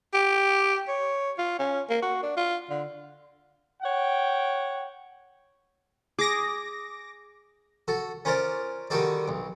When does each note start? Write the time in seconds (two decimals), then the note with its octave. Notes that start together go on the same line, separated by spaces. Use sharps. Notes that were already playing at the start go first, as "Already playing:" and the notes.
0.14 G4
0.88 C#5
1.38 F4
1.59 C#4
1.90 A#3
2.02 F#4
2.23 D4
2.37 F4
2.70 D3
3.82 C#5 F#5 G5
6.19 G#4 D6 A#6
7.88 F#4 A4
8.25 C#4 F4 A#4 C5 D5
8.90 D3 D#3 G3 F#4 A4 D5
9.28 B1